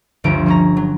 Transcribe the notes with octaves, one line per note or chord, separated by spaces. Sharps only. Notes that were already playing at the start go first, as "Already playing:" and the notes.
G1 D2 F3 F4 D7
G3 C#4 A#5
F#3